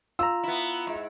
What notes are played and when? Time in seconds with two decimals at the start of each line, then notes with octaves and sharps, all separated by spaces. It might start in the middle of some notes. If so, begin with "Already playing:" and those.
0.19 F4 A#5 E6
0.43 B3 E4
0.87 G#2